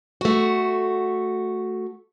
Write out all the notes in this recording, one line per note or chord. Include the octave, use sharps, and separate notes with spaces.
A3 F#4